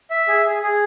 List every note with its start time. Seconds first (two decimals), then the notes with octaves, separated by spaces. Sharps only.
0.10 E5
0.28 G#4
0.46 G#4
0.63 G#4